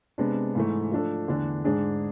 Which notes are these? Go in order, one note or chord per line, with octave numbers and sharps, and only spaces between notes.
C3 G#3 B3 D4
G#2 E3 A3
F3 A3 D4 A4
E2 D3 A3 D4
G#2 G#3 D4 G#4